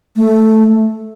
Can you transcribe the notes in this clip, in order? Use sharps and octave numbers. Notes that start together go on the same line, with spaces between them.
A3